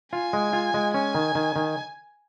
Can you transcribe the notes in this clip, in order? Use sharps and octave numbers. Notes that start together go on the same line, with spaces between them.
F4 G#5
G#3
F4
G#3
C#4 G#5
D#3
D#3
D#3